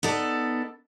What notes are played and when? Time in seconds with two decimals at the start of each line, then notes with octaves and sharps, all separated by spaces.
0.03 B3 D#4 A4 D5